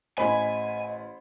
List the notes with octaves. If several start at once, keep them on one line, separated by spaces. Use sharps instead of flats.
A1 C5 D#5 G#5 B5 C6